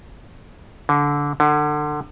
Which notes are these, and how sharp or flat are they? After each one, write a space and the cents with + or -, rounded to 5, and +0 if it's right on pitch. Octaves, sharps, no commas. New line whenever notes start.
D3 -20
D3 +25